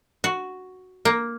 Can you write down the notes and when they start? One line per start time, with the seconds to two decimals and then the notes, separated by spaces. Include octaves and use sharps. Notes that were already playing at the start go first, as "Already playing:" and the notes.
0.24 F#4
1.05 A#3